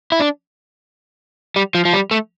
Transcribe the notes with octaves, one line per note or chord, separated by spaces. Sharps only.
E4
D4
G3
F3
F3
G3
A3